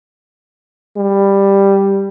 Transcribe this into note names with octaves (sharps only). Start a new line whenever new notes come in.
G3